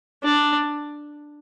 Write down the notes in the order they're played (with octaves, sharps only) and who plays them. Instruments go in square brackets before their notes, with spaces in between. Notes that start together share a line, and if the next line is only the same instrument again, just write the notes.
[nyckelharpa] D4